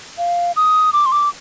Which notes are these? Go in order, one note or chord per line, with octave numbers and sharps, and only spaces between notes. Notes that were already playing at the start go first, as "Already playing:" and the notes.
F5
D#6
D6
C6
D6